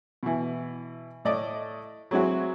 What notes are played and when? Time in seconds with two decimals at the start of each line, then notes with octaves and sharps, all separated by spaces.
0.23 B2 E3
1.25 A2 D5 D#5
2.11 F#3 G#3 C4 E4 F#4